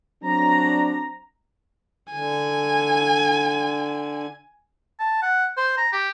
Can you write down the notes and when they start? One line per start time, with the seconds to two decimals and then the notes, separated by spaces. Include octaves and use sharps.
0.23 F#3 C4 D4 A#5
2.13 D3 G#5
5.00 A5
5.22 F#5
5.57 C5
5.78 A#5
5.93 G4